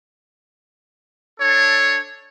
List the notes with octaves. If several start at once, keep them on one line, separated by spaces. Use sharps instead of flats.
D4 A4 C#5